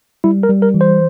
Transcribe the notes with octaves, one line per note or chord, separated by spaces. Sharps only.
G3 E4
A#4
G3
A#4
E3
C5